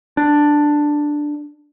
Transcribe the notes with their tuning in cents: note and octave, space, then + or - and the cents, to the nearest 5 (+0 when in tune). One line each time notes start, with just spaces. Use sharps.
D4 +5